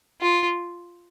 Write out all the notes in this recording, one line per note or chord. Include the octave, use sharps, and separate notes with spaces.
F4